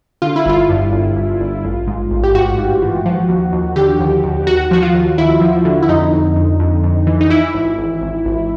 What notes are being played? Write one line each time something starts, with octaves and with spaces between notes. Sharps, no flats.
D3 F4
E4
G1 F4
G2
G1
G1
G1
A1
G#2
A1
G4
G#2 F#4
G#2
E3
F3
D#2
D#2
D3 G4
D#2
D#2
D#2 F#4
F3 F#4
F4
D#2
D#2 E4
F3
D3
E4
F2 D#4
F2
F2
F2
F2
E3
D#4
E3 E4
G#1
G#1
G#1
G#1